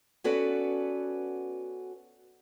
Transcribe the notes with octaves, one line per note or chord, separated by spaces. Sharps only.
B3 C#4 F#4 A4 B4 D5